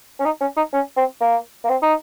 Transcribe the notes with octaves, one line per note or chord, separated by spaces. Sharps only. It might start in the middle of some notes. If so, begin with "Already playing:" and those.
C#4
D#4
C#4
D#4
C#4
C4
A#3
A#3
C4
D#4